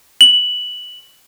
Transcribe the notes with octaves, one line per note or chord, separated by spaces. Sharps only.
F#7